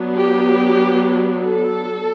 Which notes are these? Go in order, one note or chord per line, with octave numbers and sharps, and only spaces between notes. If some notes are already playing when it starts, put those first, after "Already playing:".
Already playing: F#3 B3 D4
G4
A4